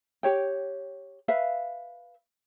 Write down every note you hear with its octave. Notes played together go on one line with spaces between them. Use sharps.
G4 C#5 G5
B4 E5 F5